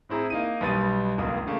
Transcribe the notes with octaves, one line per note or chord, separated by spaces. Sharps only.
A2 C4 E4 G#4 A#5
A#3 D#4 D#7
B1 B2 G3 A6 D#7
D1 C#2 A#3 D#6
C#3 A3 A#3